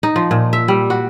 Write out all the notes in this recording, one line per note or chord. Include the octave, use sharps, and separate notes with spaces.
D#4
F3
A#2
E5
G3
F#4